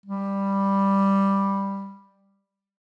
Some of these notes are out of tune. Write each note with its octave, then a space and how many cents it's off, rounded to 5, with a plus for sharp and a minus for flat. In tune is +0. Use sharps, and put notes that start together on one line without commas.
G3 +5